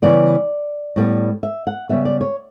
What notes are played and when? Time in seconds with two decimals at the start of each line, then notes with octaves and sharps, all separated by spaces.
0.02 C#3 E3 G3 B3 D5
0.96 A2 G3 B3
1.43 E5
1.67 F#5
1.89 C#3 G3 B3 E5
2.05 D5
2.21 C#5